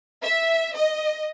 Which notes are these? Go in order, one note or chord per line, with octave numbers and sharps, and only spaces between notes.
E5
D#5